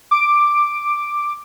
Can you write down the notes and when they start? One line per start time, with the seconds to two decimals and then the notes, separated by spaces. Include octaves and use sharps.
0.11 D6 D7